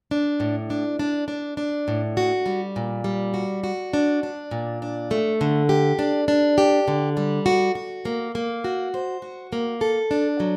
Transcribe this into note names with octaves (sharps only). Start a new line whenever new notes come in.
D4
A2
D4
D4
D4
D4
A2
F#4
G3
A#2
G3
F#4
F#4
D4
D4
A#2
D4
A3
D3
G4
D4
D4
G4
D3
G3
F#4
F#4
A#3
A#3
F#4
C5
F#4
A#3
A4
D4
F#3